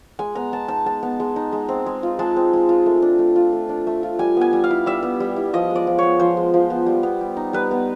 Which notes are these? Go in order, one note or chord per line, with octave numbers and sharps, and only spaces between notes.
G#3 G#5
B3 A#5
G#3 A5
D#4 A5
G#3 A5
B3
G#3
D#4
G#3
C4
G#3
F4
G#3 A5
C4
G#3
F4
A3
D4
A3
F4
A3
D4
A3
F4
G3 G#5
B3 G#5
G3
F5
E4
G3 E5
B3
G3
E4
F3 D#5
G#3
D5
F3
B3 C#5
F3 C5
G#3
F3
B3
G3
B3
G3
D#4
G3 B4
B3